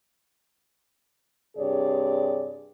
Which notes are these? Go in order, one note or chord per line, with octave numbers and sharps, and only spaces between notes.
G2 C3 G#4 C#5 D5